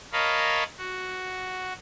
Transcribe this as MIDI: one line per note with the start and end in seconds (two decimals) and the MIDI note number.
0.13 0.64 70
0.13 0.64 73
0.13 0.64 75
0.13 0.64 77
0.13 0.64 81
0.13 0.64 83
0.78 1.73 66